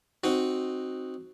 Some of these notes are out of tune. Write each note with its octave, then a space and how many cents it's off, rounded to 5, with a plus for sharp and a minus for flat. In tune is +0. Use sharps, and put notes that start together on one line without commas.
C4 +0 D#4 -10 F#4 +0